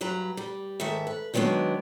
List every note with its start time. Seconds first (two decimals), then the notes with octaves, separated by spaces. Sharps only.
0.01 G2 F#3 B4 A#5
0.37 G3
0.80 G#2 D#3 A4 E5
1.07 B4
1.34 D#3 F#3 G#3 B3 D4